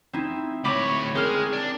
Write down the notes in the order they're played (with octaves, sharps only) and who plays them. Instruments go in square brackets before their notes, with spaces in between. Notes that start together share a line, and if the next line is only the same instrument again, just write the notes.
[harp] C4 D#4 E4
[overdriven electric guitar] D2 C#5 [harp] B5 D6 A#6
[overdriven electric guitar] G#3 [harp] C4 A#4 F6
[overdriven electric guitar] D4